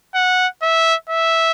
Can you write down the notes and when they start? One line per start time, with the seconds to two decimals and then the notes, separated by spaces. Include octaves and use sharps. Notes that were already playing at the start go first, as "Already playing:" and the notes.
0.15 F#5
0.62 E5
1.09 E5